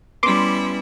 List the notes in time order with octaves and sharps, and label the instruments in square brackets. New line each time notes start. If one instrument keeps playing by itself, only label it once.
[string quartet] G3 E4 [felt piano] B3 C#4 [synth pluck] C6 D6